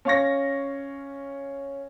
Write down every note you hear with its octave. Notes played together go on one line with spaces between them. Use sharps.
C#4 F5 C#6 A#6